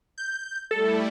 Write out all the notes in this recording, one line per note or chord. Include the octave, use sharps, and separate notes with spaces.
G6
G3 A3 E4 A4